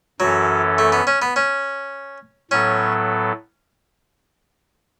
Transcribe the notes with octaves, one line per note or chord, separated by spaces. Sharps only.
F#2 E3 F#3 C#4 A4
A3
B3
C#4
B3
C#4
A2 F#3 B3 C#4 A4